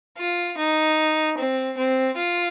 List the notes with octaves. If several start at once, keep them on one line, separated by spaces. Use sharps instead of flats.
F4
D#4
C4
C4
F4